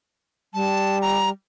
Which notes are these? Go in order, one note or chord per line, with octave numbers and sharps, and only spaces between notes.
G3 A5
A#5